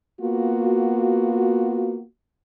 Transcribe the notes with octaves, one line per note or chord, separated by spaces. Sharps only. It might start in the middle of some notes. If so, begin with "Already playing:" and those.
A#3 B3 F4 F#4